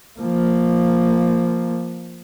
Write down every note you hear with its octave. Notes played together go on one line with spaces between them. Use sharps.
F3 A#3